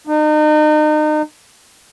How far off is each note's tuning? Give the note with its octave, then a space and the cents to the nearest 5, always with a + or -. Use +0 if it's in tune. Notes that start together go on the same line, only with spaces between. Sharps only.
D#4 -35